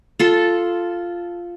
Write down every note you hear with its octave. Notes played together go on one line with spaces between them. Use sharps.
F4 A4 C6